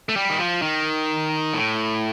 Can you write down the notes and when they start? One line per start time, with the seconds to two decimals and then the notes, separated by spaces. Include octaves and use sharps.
0.09 A3
0.16 G3
0.30 D#3
0.39 F3
0.62 D#3
1.54 A2